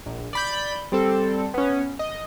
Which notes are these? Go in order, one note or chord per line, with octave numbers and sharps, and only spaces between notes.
A#1
D5 B5 G6
G3 C4 A4
B3 C#4
D#5